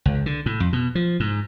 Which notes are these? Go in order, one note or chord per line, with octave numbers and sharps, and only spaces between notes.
C#2
D3
A2
F2
B2
F3
G#2